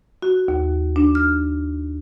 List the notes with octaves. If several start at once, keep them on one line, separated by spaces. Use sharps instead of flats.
F#4
D#2
D4
F6